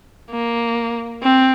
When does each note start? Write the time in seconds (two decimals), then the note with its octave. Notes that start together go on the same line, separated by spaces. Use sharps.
0.30 A#3
1.23 C4